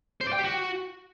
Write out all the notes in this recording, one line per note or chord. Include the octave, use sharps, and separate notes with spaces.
C5
D5
G5
G4
F#4